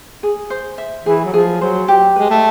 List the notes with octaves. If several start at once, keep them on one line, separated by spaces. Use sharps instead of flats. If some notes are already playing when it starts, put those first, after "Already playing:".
G#4
C5
E5
E3 G#4
F#3
F3 G#4
F#3 C5
G4
G#3 B4
A3